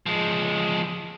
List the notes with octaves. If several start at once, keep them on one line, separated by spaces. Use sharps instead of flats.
F3 G#3